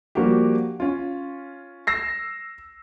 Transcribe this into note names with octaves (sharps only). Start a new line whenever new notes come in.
F3 G3 A#3 D4 F#4 G4
C#4 F4
E6 A#6 C7